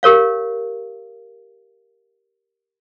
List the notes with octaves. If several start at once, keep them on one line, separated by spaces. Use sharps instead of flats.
G4 A#4 C#5 F5